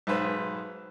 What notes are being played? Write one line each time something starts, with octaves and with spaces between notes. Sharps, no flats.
B1 G#2 B4 C5